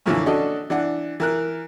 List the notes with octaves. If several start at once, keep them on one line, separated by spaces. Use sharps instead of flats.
F#2 A#2 D3 E3 F3
C#4 D4 F#4 A4 D#5
E3 D4 F#5
E3 A#4 F#6